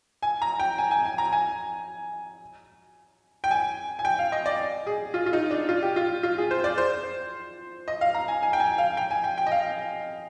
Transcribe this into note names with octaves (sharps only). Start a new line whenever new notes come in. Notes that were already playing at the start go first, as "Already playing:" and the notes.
G#5
A#5
G5
G#5
G#5
G#5
A#5
G#5
G5
G#5
G#5
G5
F5
D#5
D5
G#4
F4
F4
D#4
D4
F4
G4
F4
F4
G#4
C5
D5
C5
D#5
F5
A#5
G#5
G#5
G5
G#5
F5
G5
G#5
G5
G5
D#5
F5